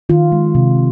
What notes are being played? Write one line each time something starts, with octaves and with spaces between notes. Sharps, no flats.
D#3 F4
G#3
C3